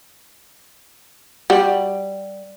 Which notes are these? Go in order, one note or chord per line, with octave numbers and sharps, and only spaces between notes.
G3 F#4